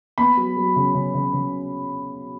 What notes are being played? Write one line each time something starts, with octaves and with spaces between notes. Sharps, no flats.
B3 B5
F#3
F#3
C#3
C#3
C#3
C#3